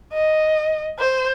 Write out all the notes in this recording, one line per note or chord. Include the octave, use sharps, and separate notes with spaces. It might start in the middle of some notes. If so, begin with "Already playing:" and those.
D#5
C5